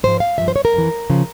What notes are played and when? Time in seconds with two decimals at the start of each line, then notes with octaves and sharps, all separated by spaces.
0.03 G#2 F3 C5
0.20 F5
0.38 G2 F3 E5
0.48 C5
0.56 C#5
0.65 A#4
0.74 F2 E3
1.10 C#3 F3